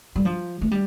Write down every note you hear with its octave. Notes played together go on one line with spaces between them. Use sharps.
G3
F3
A3
G3